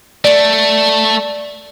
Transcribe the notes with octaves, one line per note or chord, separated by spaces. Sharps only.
A3 D5